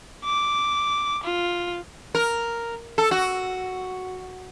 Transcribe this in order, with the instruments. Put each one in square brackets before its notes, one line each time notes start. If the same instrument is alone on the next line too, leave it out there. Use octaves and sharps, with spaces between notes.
[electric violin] D6
F4
[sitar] A#4
A4
F#4